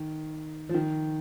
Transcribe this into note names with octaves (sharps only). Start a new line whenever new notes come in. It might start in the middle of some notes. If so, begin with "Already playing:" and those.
Already playing: D#3
F3
D#3